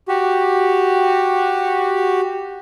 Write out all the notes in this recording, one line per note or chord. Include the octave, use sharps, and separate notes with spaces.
F#4 G4